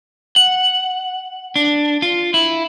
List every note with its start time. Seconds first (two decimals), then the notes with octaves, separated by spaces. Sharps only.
0.36 F#5
1.56 D4
2.02 F4
2.34 E4